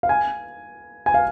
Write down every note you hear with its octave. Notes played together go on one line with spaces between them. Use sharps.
F5
G#5
G#5
F5